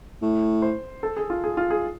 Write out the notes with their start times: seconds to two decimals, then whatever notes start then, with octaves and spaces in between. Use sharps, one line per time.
0.22 A2
0.62 C5
1.03 A4
1.17 G#4
1.30 F4
1.44 G#4
1.57 F4
1.70 G#4